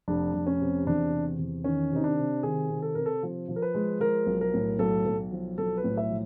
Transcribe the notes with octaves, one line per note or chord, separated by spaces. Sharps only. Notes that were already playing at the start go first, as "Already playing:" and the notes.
F1 D4
F1
C#4
C3
E2 D4
C3
E2
D#3 C#4
C3 D#4
D4
C3
D#3 G#4
C3
A4
C3 A#4
A4
F3
F3
A#4
B4
G#3
F3 A#4
B1
A#4
A2
B1 A4
B1
F3
B1 A4
B4
A2
E5
F3